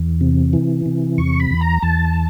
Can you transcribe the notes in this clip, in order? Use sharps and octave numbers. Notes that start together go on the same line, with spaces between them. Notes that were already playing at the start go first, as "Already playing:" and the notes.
Already playing: E2
C3
E3
C3
E2 C#6
B5
E2
A#5
E2 A5